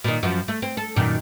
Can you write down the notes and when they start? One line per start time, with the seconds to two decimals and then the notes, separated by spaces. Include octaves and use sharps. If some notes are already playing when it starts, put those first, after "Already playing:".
0.04 A#2 D#3
0.23 F#2 F3
0.48 A3
0.62 C4
0.77 A4
0.96 F#2 A#2 D#3